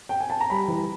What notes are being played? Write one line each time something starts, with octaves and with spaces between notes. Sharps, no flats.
G5
G#5
A5
A#5
G3 B5
E3